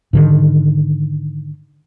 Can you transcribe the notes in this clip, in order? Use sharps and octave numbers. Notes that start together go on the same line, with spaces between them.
G#2 D3 D#3